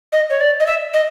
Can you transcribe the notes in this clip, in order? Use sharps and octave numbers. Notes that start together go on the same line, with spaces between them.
D#5
C#5
D5
D#5
E5
D#5